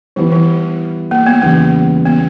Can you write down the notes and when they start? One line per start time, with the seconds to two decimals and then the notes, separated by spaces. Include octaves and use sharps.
0.16 E3 G3 B3 E4
0.32 E3
1.11 A#3
1.26 B3
1.42 E2 C#3 G3 A#3
2.05 B3